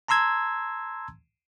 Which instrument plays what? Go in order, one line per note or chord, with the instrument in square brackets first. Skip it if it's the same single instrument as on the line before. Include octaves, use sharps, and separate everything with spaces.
[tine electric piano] A5 A#5 C6 E6 G#6